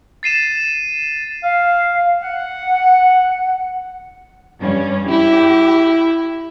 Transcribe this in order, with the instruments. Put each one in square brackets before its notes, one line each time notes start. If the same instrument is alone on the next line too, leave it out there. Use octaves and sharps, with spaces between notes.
[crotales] A6 C7 D#7 E7
[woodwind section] F5
F#5
[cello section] G2 G3 C#4
[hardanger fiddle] E4 [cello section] G4